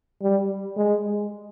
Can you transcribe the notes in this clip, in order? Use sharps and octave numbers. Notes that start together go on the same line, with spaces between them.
G3
G#3